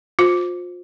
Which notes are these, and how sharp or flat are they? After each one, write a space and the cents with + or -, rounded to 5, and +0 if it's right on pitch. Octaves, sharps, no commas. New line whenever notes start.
F4 +35 C5 +0